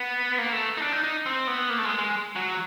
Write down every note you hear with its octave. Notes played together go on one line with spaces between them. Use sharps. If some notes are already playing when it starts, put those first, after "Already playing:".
Already playing: B3
A#3
A3
D#4
D4
D#4
D#4
C4
B3
A#3
A3
G#3
G#3
F#3